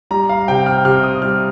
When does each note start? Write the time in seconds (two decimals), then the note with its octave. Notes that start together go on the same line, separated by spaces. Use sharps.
0.11 G3 A#5
0.29 F5
0.48 C3 G5
0.66 F6
0.85 C3 F6
1.03 D#6
1.22 G3 F6